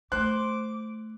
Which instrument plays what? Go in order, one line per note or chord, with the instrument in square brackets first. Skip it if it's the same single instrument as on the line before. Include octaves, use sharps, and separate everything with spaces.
[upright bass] A3 [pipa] C5 [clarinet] D6 [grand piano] F#6